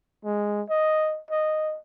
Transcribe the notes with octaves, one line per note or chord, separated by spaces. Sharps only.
G#3
D#5
D#5